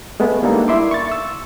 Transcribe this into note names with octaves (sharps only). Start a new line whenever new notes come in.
G#3 A3 B3
G3 A#3 D4 D#4 A4
E4 E5 C6 D6
C#6 A6
E6